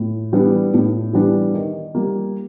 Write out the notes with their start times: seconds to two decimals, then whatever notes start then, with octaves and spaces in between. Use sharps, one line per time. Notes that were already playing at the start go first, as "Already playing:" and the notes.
Already playing: A2
0.32 E3 G3 B3 D4
0.74 A2
1.13 E3 G3 B3 D4
1.54 D#3
1.95 G3 A#3